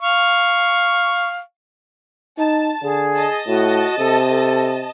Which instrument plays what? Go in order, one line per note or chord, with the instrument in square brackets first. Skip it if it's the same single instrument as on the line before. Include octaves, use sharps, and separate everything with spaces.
[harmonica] F5 C#6
[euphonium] D#4 [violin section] A5
[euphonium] D3 [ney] G#4
[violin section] D#5 A5
[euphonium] A2 [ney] F#4
[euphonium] C3 [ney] A4
[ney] A4